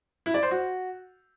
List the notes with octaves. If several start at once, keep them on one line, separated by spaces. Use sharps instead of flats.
E4
D5
C5
F#4